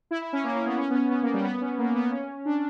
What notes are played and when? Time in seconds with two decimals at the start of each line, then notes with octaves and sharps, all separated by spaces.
0.11 E4
0.22 E4
0.33 C#4
0.44 A#3
0.55 A#3
0.66 B3
0.78 C#4
0.90 B3
0.94 C#4
1.11 B3
1.22 A#3
1.34 G3
1.44 B3
1.61 C#4
1.78 A#3
1.95 B3
2.11 C#4
2.46 D4